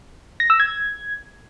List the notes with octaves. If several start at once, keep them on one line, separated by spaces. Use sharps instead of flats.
A#6
E6
G#6